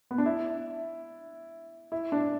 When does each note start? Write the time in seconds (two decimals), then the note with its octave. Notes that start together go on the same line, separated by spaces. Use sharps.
0.11 B3
0.18 D4
0.26 E4
1.92 E4
2.12 D4